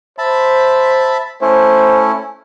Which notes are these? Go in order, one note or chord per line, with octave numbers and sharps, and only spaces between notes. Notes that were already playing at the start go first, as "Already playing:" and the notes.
C5 E5 A5 B5
A3 C#4 E4 C5